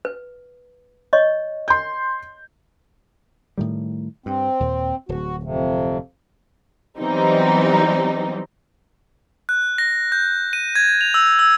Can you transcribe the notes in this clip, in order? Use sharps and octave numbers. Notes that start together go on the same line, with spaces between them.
B4
C#5 D#5 C#6
C6 G6
A2 D#3 G3
G2 C4
D#2 A#2
D1 F#4
F2 C3
E3 F#3 G3 B3 C4 D#4
F#6
A#6
G6
D#7
G#6
F7
E6
E6